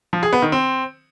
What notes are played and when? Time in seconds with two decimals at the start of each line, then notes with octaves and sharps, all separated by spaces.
0.13 F3
0.23 G#4
0.33 B3
0.42 D#3
0.52 C4